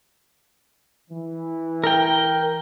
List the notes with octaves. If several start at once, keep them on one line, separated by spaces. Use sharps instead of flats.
E3
A#4 G5